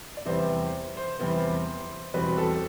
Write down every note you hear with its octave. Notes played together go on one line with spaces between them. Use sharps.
D5
E2 C3 G3 B3 C5
C5
E2 C3 G3 B3
E2 B2 G3 C4 B4
A4